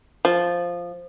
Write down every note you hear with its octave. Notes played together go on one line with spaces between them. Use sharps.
F3